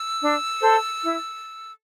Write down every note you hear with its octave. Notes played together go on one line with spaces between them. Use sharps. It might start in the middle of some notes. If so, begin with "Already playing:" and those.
Already playing: E6
D4
A4 C5
E4